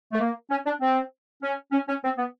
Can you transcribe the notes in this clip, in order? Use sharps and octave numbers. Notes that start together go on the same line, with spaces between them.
A3
A#3
C#4
D4
C4
C#4
C#4
C#4
C4
B3